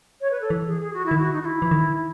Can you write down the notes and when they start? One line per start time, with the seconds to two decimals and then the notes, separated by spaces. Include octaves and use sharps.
0.21 C#5
0.30 B4
0.41 A4
0.50 E3
0.66 G#4
0.81 G#4
0.93 F#4
1.05 E4
1.11 D#3
1.18 F#4
1.32 D#4
1.41 F#4
1.44 E4
1.62 E3
1.71 D#3